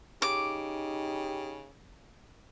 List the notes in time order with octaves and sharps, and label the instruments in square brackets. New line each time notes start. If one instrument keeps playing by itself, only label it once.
[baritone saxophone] C#3 [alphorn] D#4 [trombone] G4 [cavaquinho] D6